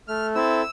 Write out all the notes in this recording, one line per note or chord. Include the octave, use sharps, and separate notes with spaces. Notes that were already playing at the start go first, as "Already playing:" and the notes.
A3 F6
C4 E4 A4 E6